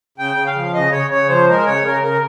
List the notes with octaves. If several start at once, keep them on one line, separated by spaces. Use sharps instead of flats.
C#3 G5
C#3
F5
F3
C#3 D#5
C#3 C#5
C#3 C#5
F3 C5
G#3 A#4
C#3 C#5
C#3 A#4
C#3 A#4